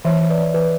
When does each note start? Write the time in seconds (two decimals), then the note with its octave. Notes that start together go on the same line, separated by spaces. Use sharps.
0.05 E3 C#5 E5
0.21 E3
0.30 B4 D5
0.38 E3
0.54 E3 B4